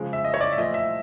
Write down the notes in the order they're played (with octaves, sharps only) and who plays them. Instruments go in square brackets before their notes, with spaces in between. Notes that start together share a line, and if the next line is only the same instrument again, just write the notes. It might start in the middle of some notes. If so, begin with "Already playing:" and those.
Already playing: [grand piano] C#3 F3 G#3
E5
D#5
C#5
D5
E5
A#2 F3 A3 D#5
E5